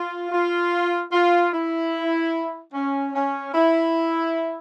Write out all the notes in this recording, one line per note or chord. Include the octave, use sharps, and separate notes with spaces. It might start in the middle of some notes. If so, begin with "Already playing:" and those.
Already playing: F4
F4
F4
E4
C#4
C#4
E4